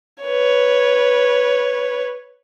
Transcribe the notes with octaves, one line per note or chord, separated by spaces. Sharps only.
B4 C#5